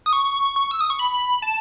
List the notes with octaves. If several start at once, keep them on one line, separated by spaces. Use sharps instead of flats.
D#6
C#6
C#6
E6
D#6
C#6
B5
A5